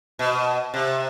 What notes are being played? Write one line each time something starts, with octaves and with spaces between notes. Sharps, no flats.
B2
C3